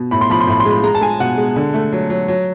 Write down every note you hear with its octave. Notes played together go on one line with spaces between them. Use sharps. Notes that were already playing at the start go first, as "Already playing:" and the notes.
Already playing: B2
A2 B5
C6
F3 B5
C6
A2 B5
C6
G#3
B5
G#3 A#5
A5
G#3 G#5
B2 F#5
G#3
D3
A3
F#3
F#3
F#3